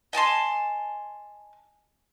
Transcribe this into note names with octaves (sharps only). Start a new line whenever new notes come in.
D#5 G#5 A5 C6